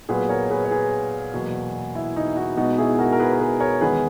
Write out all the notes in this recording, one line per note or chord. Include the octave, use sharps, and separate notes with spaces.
A#2 F#3 B3 G#4 B4
A#4 C#5
C#5
G#4 B4
C#5
G#4 B4
E2 B2 F#3 A#3
E4
D#4
D#4 F#4
B2 G#3 B3 D#4 F#4
E4 G#4
F#4 A#4
A#4
G#4 B4
A#4
G#4 B4
A#4 C#5
E2 D#3 G#3 B3 G#4 B4